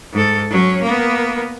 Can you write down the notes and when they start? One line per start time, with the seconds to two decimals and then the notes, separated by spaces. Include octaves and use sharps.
0.13 G#2 A4
0.50 F#3 C#4
0.83 A#3 B3